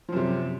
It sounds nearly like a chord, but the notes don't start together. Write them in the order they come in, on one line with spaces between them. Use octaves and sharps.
F3 F#2 C3